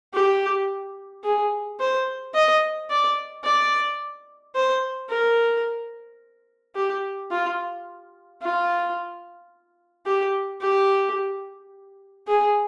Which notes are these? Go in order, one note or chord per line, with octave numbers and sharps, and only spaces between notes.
G4
G#4
C5
D#5
D5
D5
C5
A#4
G4
F4
F4
G4
G4
G#4